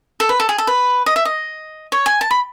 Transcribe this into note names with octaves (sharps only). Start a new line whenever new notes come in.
A4
B4
A4
G#4
A4
B4
D#5
E5
D#5
C#5
G#5
A5
B5